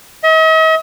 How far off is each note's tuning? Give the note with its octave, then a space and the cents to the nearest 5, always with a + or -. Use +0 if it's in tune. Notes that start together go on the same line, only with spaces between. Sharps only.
D#5 +45